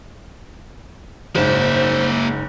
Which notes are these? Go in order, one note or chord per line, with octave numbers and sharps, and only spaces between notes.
F#1 G#2 A#3 C5 E5